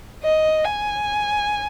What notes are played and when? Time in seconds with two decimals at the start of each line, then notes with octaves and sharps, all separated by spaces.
0.23 D#5
0.65 G#5